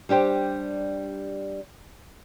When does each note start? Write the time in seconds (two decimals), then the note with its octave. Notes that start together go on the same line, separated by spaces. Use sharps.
0.09 G3 D4 G4 C5